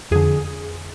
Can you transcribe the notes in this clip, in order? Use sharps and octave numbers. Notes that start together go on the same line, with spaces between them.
F2 D3 G#4